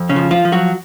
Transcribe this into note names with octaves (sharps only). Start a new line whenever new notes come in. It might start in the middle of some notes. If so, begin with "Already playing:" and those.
Already playing: F2
C#3 C#4
F3
F3 F4
F3
F#3 F#4